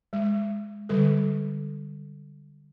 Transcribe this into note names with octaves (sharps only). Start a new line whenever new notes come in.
G#3
D3 G3 A4